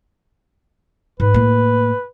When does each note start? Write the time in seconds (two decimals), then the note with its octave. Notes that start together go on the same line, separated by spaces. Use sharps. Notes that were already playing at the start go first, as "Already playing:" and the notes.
1.20 G#2 B4
1.34 A2 A#3